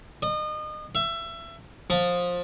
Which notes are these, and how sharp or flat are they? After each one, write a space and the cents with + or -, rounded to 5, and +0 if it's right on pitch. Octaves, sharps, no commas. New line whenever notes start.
D#5 -30
E5 +25
F3 +20